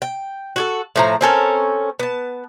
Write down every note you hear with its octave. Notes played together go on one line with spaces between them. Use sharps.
G5
F#4 G#4 A4
A2 F3 A#5
C4 C#4 A4 A#4
B3 A5